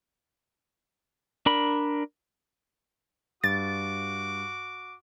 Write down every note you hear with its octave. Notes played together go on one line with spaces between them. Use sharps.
D4 A#4 B5
G2 F#4 D6 A6